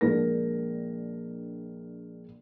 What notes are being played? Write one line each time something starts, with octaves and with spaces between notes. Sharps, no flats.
A#1 G#3 D4 A#4 A#6